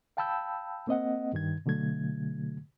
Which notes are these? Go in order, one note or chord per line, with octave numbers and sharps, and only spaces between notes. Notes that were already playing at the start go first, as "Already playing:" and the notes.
F5 G5 A5 B5 E6 G6
A#3 C4 D#5 F#5
G2 D#3 G#6
B2 D3 F#3 A3 G#6